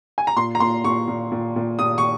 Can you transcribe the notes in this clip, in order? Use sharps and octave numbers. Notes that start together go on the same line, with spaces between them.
G#5
A#5
A#2 C6
A#5
A#2 C6
A#2 C#6
A#2
A#2
A#2
A#2 D#6
C#6